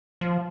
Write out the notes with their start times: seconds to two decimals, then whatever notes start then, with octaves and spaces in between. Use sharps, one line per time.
0.21 F3